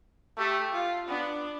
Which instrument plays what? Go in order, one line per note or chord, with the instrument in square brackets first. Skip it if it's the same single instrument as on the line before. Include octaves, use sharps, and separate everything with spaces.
[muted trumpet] A3 [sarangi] G4
[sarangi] F4
[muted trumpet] B3 [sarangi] D4